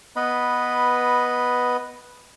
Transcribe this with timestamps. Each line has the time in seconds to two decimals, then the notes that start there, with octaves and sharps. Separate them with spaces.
0.16 B3 B4 D#5 B5